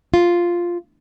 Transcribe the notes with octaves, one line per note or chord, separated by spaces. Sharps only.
F4